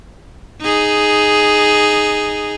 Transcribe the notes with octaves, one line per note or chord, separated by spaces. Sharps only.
D#4 G#4